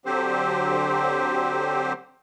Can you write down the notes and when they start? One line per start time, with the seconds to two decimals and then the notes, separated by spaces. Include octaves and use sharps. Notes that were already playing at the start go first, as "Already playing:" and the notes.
0.06 D3 F#3 C4 G4 C5